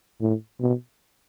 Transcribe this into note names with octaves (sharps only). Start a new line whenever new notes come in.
A2
B2